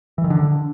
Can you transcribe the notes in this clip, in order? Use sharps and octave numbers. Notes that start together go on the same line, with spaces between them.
E3
D#3
D3